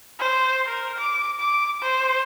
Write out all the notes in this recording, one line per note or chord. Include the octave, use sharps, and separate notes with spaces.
C5
A#4
D6
D6
C5